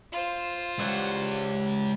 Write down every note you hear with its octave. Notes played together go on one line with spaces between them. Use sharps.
F4 C5
E3 G3 G#3 C#5 F#5